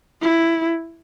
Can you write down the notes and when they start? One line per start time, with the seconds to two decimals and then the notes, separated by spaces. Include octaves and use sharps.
0.21 E4